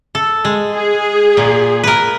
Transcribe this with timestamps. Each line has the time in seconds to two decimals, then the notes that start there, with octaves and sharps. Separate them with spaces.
0.15 A4
0.45 G#3
0.74 G#4
1.37 A#2
1.84 A#4 B4